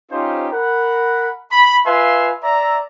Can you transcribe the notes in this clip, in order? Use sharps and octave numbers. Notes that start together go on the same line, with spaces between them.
C#4 D#4 F4 G4 C5
A#4 F#5 B5
B5
F4 B4 E5 F5 G#5 C6
D5 E5 A#5